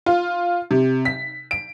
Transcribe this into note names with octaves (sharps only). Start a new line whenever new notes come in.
F4
C3
B6
D7